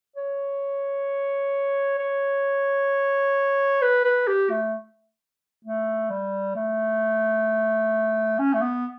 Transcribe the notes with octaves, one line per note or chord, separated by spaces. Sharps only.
C#5
C#5
B4
B4
G4
A3
A3
G3
A3
C#4
A3
B3